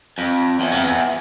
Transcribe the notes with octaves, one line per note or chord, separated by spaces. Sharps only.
F2
E2
F2
E2